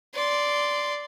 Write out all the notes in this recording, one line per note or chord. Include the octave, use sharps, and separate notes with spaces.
D5 C6